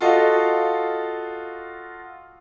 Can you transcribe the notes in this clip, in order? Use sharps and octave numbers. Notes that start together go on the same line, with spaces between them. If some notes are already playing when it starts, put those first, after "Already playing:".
F4 F#4 A4 D#5 F5